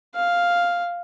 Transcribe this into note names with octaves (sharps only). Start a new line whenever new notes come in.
F5